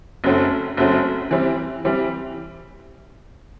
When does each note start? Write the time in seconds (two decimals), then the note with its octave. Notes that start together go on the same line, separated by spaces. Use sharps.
0.24 F#1 F#2 F#3 A3 C4
0.77 F#1 F#2 F#3 A3 C4
1.31 E3 G3 C4
1.85 E3 G3 C4